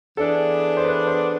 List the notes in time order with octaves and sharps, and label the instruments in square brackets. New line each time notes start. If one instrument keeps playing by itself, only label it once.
[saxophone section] E3 B3 D4 G#4 [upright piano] A4
[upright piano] C5
B4
C5